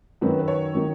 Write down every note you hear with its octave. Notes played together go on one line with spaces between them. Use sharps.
F#2 D#3 F#3 B4
B4
C#5
D#3 F#3